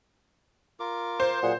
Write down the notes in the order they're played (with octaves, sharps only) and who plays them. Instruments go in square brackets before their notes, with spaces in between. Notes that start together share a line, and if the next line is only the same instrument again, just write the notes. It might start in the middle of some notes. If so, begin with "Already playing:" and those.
[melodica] F4 A#4 D6
[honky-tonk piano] C5
[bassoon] A#2 [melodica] F#3 G#4 F#5